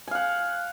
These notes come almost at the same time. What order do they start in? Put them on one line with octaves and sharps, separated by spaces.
G#5 F5 F#5